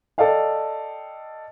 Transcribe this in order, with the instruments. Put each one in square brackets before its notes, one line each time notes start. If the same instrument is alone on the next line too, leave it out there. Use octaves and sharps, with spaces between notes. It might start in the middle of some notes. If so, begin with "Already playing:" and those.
[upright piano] A4 D5 D#5 F5 G5